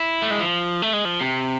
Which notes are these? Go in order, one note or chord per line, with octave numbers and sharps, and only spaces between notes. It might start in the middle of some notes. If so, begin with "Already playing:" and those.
Already playing: E4
A3
G#3
F3
A3
G#3
F3
C3